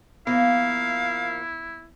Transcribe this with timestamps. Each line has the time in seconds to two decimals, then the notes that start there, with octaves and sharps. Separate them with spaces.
0.27 F3 A#3 B3 E4 F5